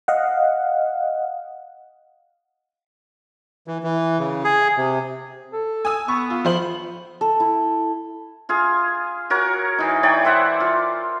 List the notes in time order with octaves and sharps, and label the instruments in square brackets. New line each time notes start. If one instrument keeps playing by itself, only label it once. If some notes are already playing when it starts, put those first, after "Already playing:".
[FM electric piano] D#5 F5 F#5
[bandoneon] E3
E3
C#3
G#4
C3
[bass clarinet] A4
[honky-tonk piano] G#5 D#6 E6
[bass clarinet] B3 [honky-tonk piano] C#6
[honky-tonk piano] F4
F3 C5 F#7
[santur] A4
E4
[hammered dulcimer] F4 G#4 F5
F#4 A#4 C#5
E3 D#4
C#5 D5 G5
C5 E5 F#5
F4